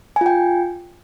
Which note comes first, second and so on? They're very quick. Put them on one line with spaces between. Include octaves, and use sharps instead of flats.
G#5 F4 G5